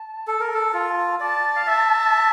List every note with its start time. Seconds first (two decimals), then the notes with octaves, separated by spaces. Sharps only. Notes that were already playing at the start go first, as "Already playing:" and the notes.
Already playing: A5
0.27 A4
0.40 A#4
0.54 A4
0.74 F4
1.20 D5 A5
1.56 F5
1.67 E5